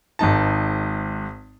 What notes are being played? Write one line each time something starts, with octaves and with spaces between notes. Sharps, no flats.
G#1 G#2 D#4 A5